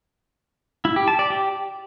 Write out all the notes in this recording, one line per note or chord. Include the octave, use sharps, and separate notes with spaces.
E4
G4
A5
D5
G4